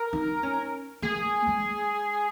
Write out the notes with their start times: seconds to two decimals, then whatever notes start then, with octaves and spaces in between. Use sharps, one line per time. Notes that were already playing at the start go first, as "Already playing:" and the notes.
Already playing: A#4
0.13 D#4
0.43 C#4
1.02 A#3 G#4
1.47 G#3